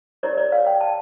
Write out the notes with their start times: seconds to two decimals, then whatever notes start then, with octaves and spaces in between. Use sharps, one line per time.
0.23 E4 G4 A#4 C#5 D5
0.38 D5
0.52 F5
0.67 G5
0.81 A5